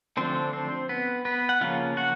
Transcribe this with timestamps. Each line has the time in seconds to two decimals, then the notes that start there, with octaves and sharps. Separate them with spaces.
0.17 D3 F3 A3 C4 D4 C5
0.53 C4 C5
0.89 B3 B4
1.25 B3 B4
1.49 F#5
1.61 C#3 F3 A#3 C#4 F4 F5
1.97 F#4 F#5